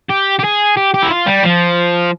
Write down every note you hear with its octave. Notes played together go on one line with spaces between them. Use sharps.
G4
G4
G#4
G4
G4
E4
F4
G3
F3